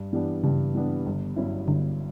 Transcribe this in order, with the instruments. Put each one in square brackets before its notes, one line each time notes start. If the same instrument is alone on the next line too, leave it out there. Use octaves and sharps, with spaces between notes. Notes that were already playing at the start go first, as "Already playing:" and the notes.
Already playing: [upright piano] G2
E3 G3 B3 D4
[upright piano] G2 [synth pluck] C#3
[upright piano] E3 G3 B3 D4
G1
G2 F#3 C#4 E4
[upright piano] G1 [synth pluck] D3